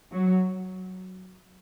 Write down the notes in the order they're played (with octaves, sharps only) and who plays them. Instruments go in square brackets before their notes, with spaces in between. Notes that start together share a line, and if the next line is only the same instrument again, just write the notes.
[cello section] F#3